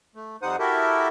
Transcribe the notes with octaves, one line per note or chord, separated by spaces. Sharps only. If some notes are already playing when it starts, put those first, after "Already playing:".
A3
F2 G3 D#4 C5 F#5 D#6
E4 F#4 G4 A4 A#4 E5